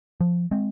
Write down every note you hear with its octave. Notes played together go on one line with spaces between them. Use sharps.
F3
G#3 C4